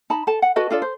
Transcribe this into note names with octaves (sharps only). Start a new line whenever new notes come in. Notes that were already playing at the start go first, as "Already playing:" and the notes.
D#4 A5 B5
A4 A5
F#5
F#4 A4 B4 D#5
D4 F4 A4 D5
C5